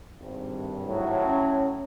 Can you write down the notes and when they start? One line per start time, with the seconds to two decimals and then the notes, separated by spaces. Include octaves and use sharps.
0.20 G#1 G2
0.85 A2 F#3
1.25 C#4